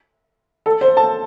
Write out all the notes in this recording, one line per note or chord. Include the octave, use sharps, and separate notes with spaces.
A4
C5
A5